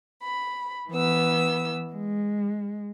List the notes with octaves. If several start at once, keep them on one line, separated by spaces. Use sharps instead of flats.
B5
E3 B3 E6
G#3